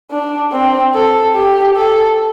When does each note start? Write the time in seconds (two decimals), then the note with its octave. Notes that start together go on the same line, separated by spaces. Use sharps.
0.11 D4
0.52 C4
0.94 A4
1.35 G4
1.76 A4